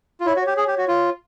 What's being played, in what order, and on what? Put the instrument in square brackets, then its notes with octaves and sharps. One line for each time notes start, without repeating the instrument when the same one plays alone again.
[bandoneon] F4
[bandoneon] E4 [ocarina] C#5
[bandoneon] F#4
[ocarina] C#5
[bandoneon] G4
G#4
G4
F#4
F4